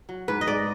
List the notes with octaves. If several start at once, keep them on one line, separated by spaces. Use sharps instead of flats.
F#3
G#2 B4
D#5
G#2 D5